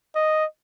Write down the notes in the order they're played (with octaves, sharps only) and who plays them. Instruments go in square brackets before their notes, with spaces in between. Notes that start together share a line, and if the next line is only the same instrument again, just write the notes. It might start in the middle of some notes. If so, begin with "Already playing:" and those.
[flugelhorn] D#5